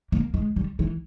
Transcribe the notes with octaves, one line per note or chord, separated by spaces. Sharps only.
A#3
G#3
G3
E3